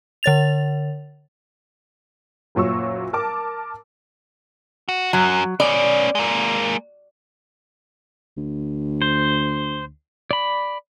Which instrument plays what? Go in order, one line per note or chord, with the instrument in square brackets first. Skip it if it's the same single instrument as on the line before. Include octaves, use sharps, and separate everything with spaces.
[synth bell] D3 C#5 A6 F7
[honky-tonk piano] F#1 A#2 F#3 C#6 E6
A#4 A5 D6
[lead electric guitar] F#4
[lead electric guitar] F#2 [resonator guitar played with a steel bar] F#3
[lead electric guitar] B3 C#4 [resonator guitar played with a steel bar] D5
[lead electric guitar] G#3 A#3
[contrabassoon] D2
[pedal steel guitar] C5
D5 B5